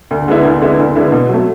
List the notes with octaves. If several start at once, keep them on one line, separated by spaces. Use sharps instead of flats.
D2
D3 G#3 B3 E4
D2
D3 G#3 B3 E4
D2
D3 G#3 B3 E4
B2
F#3 A3